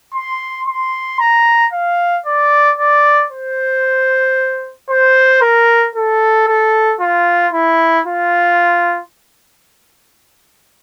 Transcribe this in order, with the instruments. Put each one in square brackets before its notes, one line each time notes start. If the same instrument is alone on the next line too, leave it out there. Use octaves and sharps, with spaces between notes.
[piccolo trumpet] C6
C6
A#5
F5
D5
D5
C5
C5
A#4
A4
A4
F4
E4
F4